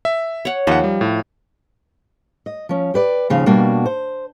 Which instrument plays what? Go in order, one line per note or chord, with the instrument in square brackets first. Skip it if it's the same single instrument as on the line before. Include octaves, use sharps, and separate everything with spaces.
[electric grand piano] E5
[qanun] C#5 F#5
[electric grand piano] D#2 F#5 [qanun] F3 D#4 C5
[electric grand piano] G3
A2
[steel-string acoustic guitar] D#5
F3 C#4
G4 B4 D5
D#2 C#3 F3 F5
B2 G3 A#3 D4 F#4
C5